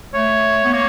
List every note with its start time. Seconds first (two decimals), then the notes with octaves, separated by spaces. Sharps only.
0.14 A3 C#5
0.65 B3
0.73 A#3 C#5